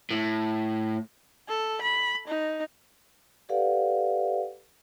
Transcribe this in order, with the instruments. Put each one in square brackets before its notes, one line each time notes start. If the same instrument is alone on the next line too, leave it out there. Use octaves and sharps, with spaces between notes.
[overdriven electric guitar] A2
[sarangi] A4
B5
D#4
[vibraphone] G4 A4 B4 D5 F5 F#5